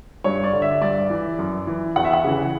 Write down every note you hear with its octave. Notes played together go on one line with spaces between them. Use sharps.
G2 C#5
D5
D3
E5
G2 D5
E3
F#2
E3
E2 F#5
E5
F#5
C#3 E3